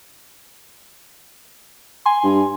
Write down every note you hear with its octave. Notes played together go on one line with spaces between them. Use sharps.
G#5 C6
G2